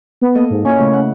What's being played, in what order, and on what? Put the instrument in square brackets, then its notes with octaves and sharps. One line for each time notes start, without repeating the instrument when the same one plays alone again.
[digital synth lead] B3
[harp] A#3 A4 D#5
[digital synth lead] G#2
[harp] A#2 E4 [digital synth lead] C#4
[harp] C#3 A3 C#5
F#5